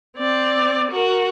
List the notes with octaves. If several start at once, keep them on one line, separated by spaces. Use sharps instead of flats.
C4 D5
F#4 A#4